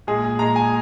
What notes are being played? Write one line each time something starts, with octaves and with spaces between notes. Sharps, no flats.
A#2 G#3 G#4
A#2 G#3 A#5
G#5